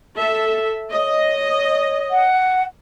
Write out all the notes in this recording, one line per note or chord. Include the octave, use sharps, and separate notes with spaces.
A4 E5
C#5 D#5
F#5